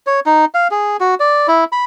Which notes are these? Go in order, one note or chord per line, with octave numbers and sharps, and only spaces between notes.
C#5
D#4
F5
G#4
F#4
D5
E4
B5